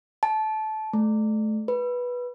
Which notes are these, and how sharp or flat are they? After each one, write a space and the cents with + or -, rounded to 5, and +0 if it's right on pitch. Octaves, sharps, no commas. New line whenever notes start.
A5 -20
A3 -25
B4 -10